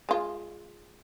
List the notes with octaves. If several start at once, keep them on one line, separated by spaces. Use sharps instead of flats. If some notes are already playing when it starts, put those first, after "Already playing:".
G#3 F4